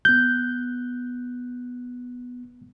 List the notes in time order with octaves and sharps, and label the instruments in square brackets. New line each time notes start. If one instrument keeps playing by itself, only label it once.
[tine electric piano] B3 F#6 [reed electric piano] G6